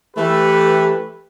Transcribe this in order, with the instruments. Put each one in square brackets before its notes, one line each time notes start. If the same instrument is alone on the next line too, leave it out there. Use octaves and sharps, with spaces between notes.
[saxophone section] E3 A3 [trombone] G4 [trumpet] B4